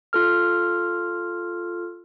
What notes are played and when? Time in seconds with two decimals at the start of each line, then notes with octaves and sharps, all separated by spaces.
0.13 F4 A4 F6